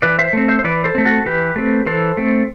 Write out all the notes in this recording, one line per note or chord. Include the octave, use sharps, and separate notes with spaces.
E3 B4 D5
C5 E5
A3 C4
C5 E5
C5
E3 B4 D5
A4 C5
A3 C4
F#4 A4
E3 G4 B4
A3 C4
E3 A4 C5
A3 C4